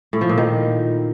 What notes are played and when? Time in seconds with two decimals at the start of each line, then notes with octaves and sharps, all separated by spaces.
0.13 A2
0.21 F3
0.29 A#2
0.38 D#3